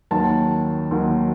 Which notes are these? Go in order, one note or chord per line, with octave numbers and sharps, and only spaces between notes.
D#2 D#3 F#3 A5
D#2 D#3 F#3